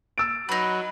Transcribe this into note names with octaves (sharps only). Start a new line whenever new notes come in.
E6 A6 D7
F#3 D#4 B4